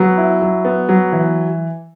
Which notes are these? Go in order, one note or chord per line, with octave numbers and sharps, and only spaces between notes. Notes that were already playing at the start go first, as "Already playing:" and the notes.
Already playing: F#3 B3
E4
F#3
B3
F#3
E3